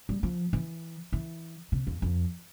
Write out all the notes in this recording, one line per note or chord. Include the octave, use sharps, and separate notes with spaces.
G3
F3
E3
E3
C3
E2
F2